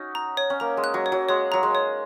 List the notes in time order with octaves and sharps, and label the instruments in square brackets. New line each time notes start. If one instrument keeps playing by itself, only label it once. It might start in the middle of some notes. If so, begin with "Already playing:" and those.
Already playing: [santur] C#4 D#4 F#4
[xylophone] A#5
C#5
[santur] C#4
[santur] A#3 [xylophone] A#5
[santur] G#3
[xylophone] F#6
[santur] F#3
[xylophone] C#5
[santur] F#3
[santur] G#3 [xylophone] C#5
[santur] F#3 [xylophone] A#5
[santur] G#3
[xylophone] C#5